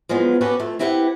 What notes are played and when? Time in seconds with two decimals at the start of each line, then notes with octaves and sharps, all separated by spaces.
0.09 F3 F#3 G#3 B3
0.41 B3 C#4 F#4 G4 A4 B4
0.60 F2 A3
0.79 C4 E4 G4 B4 E5 F#5